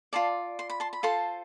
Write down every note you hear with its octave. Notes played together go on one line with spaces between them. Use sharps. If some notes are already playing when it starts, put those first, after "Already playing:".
F4 A4 D5 A5 C6
C6
B5
A5 C6
B5
F4 A4 C5 A5 C6